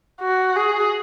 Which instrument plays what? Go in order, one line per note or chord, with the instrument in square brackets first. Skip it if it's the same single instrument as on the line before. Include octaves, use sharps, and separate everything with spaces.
[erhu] F#4
G#4